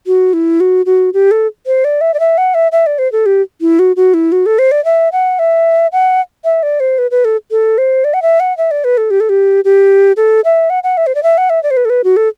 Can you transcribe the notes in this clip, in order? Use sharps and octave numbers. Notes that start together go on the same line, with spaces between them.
F#4
E4
F#4
F#4
G4
A4
C5
D5
E5
D5
E5
F#5
E5
E5
D5
C5
A4
G4
E4
F#4
F#4
E4
F#4
A4
C5
D5
E5
F#5
E5
F#5
E5
D5
C5
B4
B4
A4
A4
C5
D5
F#5
E5
F#5
E5
D5
B4
A4
G4
A4
G4
G4
A4
E5
F#5
F#5
E5
C5
D5
E5
F#5
E5
D5
C5
B4
A4
B4
F#4
A4